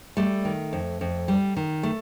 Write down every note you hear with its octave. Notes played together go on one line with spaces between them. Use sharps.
G3 A3
D#3
F2
F2
G3
D#3
A3